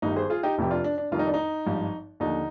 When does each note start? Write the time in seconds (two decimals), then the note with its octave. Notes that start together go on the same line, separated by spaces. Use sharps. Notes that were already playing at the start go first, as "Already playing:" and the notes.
0.02 G1 G2 D#3 G3 D#4
0.16 G#4 C5
0.30 F4 G#4
0.43 D#4 G4
0.58 F1 F2 C3 F3 G4
0.71 D4 F4
0.84 D4
0.98 D4
1.11 F1 F2 D#3 G3 F4
1.19 D#4
1.27 D4
1.34 D#4
1.66 G#1 G2 F3
2.20 D#2 D3 F3 D#4